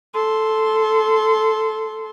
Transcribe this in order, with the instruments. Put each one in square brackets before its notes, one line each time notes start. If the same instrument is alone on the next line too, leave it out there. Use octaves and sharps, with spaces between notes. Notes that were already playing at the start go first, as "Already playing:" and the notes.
[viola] A4 C6